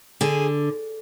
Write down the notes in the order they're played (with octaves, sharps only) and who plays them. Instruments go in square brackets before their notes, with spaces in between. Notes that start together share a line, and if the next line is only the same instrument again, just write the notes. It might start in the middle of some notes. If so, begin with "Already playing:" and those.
[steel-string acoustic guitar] D3 G#4